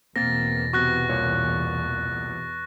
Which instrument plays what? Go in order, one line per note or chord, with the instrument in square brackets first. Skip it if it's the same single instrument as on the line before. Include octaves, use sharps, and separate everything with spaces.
[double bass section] E2 B2 [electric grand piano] A#3 C4 A#4 [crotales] A6 A#6
[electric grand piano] C3 B3 F#4 [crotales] C#6 F#6 A#6
[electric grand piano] C2 A#2 C#5